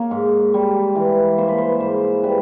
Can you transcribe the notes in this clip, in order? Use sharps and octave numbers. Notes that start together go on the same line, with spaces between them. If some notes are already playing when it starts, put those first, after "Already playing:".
Already playing: A#3 C#5
G#2
G3
E3
A#3 C5
B4
C5
G#2 C5
G3 B4